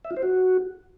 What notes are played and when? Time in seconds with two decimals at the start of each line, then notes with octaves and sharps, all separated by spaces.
0.05 E5
0.11 F4
0.17 C5
0.23 F#4